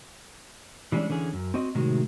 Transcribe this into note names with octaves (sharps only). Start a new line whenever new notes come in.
E3 G3 G#3 A#3 C#4 D4
D3 E3 C#4 G#4
F#2
C4 F#4 D#5
A2 C3 D#3 F#3 G#3 F#4